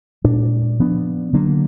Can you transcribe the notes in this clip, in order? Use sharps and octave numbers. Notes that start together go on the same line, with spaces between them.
A#2 G#3 D4
F3 B3 D4
D3 F#3 A#3 D4